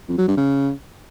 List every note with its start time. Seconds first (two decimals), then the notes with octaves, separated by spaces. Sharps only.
0.09 F2
0.18 F#3
0.28 G2
0.37 C#3